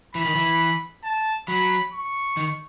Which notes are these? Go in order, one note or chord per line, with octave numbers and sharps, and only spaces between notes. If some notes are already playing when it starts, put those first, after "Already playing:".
E3 B5
D#3
E3
A5
F#3 B5
C#6
D#3